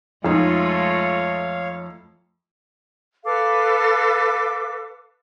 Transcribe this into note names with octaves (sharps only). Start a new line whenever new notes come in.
F2 G#3 A3 D#4 F4 C#5 F5
A4 B4 F5 D6